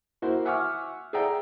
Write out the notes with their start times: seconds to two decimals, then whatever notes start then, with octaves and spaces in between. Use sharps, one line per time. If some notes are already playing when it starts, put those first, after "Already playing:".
0.22 A#3 E4 F#4 C5
0.45 E5 F#5 G#5 C#6 D6 F6
1.13 G#4 D5 E5 F#5 G5 A#5